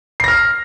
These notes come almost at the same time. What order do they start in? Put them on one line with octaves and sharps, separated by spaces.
C7 A#6 F6